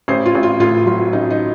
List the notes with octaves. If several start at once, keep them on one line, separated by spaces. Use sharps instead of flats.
A1 C5
F4
A1
F4
A2 F4
F#3 F4
A1 D#4
D#4